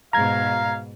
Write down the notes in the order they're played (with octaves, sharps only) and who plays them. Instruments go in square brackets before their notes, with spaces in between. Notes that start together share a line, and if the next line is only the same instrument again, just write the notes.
[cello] G#2 B2 [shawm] F5 [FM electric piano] A#5 G#6